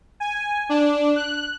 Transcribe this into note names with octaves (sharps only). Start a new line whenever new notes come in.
G#5
D4
F#6